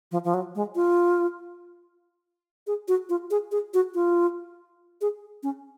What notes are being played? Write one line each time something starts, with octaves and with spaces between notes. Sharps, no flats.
F3
F3
F#3
G#3
F4
G#4
F#4
F4
G#4
G#4
F#4
F4
G#4
C#4